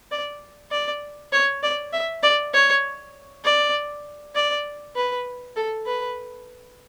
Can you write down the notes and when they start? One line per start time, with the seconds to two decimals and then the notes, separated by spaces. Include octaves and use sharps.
0.11 D5
0.71 D5
1.32 C#5
1.63 D5
1.93 E5
2.23 D5
2.54 C#5
3.44 D5
4.35 D5
4.96 B4
5.56 A4
5.86 B4